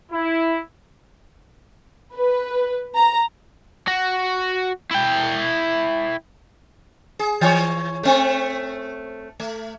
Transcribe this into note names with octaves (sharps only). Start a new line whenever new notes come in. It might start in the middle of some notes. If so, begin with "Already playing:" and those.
E4
B4
A#5
F#4
E4 G5
G#4
E3 C#5
A3 C4
A3